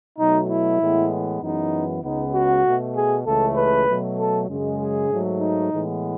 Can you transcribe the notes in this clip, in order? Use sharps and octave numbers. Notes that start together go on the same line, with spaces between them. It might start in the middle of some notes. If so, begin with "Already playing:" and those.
B2 F#3 A3 D#4
E4
A2 E3 G#3 B3
F#2 E3 G#3 B3 D#4
C#2 C#3 G#3 B3 D#4
F#4
B2 A3
G#4
C#2 C#3 E3 A3 A4
B4
B2 F#3 A3
A4
F#2 C#3 G#3
G#4
G#2 F#3 A3
D#4
A2 E3 G#3 B3